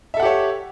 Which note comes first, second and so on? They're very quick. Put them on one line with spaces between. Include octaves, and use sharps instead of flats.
E5 A4 F#5 G4 C#5